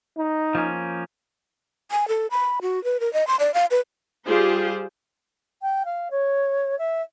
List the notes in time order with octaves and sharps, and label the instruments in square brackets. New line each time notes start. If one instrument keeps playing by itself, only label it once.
[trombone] D#4
[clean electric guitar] F3 A#3 C#4
[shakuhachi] G#5
A4
B5
F#4
B4
A#4
D#5
C6
D5
F5
B4
[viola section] G3 F4 G4 G#4 C5
[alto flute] G5
F5
C#5
E5